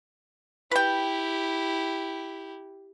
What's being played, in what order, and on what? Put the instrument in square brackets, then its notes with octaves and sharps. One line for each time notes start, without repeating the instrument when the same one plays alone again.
[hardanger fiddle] E4 G4 [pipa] B4 G5